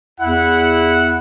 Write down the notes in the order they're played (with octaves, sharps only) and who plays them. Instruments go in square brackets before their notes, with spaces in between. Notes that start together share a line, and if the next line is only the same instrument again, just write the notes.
[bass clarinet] E2 [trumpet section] E4 F#5